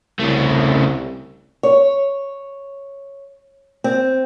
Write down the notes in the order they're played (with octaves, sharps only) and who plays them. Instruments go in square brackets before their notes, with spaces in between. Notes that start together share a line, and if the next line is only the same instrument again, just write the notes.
[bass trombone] C2 [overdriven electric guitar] C#3 A3
[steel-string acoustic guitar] C#5
C4